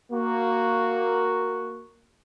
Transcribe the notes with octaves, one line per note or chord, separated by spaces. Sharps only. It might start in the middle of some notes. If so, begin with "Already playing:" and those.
A#3 F#4